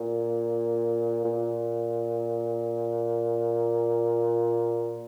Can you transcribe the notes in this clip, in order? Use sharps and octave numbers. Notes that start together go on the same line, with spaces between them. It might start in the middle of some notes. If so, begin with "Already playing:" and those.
Already playing: A#2
A#2